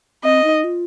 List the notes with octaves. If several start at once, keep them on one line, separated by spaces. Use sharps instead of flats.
C4 D#5
D#4
F4